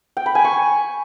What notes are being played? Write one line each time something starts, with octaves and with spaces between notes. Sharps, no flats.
G5
B5
G#5
C#6